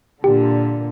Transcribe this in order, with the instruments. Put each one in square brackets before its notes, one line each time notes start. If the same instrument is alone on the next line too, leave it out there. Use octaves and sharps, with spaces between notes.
[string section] A#2 D3 [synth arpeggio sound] G4